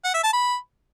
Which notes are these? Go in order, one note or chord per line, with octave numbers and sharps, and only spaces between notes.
F#5
E5
A5
B5